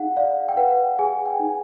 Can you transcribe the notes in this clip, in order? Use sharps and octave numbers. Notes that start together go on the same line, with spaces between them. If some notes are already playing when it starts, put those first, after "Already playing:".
Already playing: D#4 G#4 F5 F#5
D5 F5
G5
B4 F#5
G#4 G#5
G5
D#4